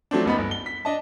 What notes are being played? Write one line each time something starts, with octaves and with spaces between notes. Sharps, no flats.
F3 F#3 A3 C4 D4
F#1 C#2 B3 D#4 B5
G1
G7
B6
D4 D#5 A5